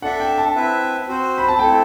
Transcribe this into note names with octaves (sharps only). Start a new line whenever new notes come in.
D4 A4 E5 F#5
G5
A5
C4 E4 B4 E5
C4 F#4 C5
B5
A5
A3 C4 E4 A4 G5